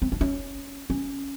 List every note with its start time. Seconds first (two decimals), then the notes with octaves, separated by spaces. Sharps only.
0.02 C4
0.12 D4
0.21 C#4
0.90 C#4